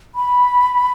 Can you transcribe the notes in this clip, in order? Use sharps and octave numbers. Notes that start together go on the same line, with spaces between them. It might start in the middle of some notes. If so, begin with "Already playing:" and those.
B5